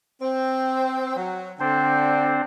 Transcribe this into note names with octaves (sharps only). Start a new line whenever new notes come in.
C4
F#3
D3 C4 D4 C5